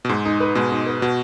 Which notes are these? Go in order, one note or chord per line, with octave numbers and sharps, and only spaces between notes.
B2
G#2 G#3
D#4
B4
B2 G#3
D#4
B4
B2 F#4